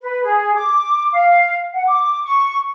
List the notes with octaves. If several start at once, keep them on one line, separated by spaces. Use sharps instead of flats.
B4
G#4
D6
F5
F#5
D6
C#6